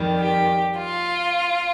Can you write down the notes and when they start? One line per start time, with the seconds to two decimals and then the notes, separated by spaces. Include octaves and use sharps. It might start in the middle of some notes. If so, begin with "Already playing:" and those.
Already playing: F2 D#3 G3
0.19 G4
0.76 F4